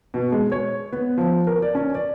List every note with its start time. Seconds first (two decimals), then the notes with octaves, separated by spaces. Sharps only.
0.14 B2
0.32 G#3
0.52 C#5
0.92 B3
1.18 F3
1.47 A#4
1.62 D5
1.75 C#4
1.95 D5